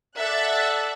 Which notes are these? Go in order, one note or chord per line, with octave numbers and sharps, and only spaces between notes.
A4 D5 E5 F#5 F#6 A6